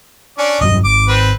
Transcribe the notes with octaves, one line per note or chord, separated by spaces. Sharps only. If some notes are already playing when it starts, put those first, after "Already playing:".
C#4 D4 D5
E1 G2 F#3 D#5
G#1 D6
C4 B4